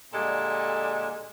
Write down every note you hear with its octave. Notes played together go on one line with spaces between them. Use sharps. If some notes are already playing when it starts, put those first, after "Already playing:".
A#2 D3 G3 G#3 A4